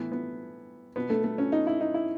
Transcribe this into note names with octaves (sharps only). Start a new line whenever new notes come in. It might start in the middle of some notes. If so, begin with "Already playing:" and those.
Already playing: A2 E3 B3
B3
B2 B3
A3
A3
C#4
D#4
E4
D#4
E4